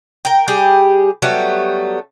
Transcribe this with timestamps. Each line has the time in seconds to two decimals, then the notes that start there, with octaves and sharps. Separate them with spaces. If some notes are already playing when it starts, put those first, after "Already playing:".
0.25 A#4 G5
0.48 G3 G4 G#4
1.22 F#3 G3 A3 B3